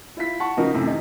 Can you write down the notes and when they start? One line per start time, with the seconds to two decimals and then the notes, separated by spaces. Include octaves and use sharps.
0.17 E4 F4 B6
0.40 F#5 A5 C#6
0.57 C#3 F3 D#4 F#4 A#4
0.74 F#2 A2 C3 E3
0.87 D#3 D#4